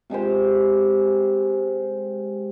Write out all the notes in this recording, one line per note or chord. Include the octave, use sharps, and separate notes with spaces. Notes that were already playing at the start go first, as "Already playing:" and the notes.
C3 G#3 G4 C5